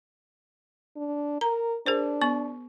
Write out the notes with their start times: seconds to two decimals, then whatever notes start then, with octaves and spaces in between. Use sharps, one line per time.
0.96 D4
1.41 A#4 A#5
1.86 D4 G#4 A#4 C5
2.21 B3 C#6